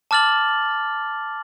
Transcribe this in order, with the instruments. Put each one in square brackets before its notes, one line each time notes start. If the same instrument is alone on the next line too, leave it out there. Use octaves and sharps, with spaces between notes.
[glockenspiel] A5 D6 F6 A6 F#7